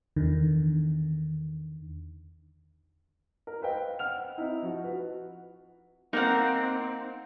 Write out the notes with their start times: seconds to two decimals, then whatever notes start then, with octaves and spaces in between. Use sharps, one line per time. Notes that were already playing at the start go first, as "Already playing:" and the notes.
0.16 E2 D3 D#3
3.47 A#4
3.62 B4 C5 D#5 F5 G5
3.99 F#5 F6 F7
4.38 C4 D#4 E4
4.62 F3 F#4
4.83 F#4 B4
6.13 A#3 C4 D#4 F5 F#5